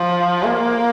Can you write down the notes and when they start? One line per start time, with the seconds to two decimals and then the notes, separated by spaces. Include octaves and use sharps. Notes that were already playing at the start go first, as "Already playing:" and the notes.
Already playing: F3
0.44 A#3